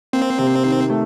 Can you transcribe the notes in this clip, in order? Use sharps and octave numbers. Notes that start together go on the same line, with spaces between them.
A#3 C4
C3
D#3
A3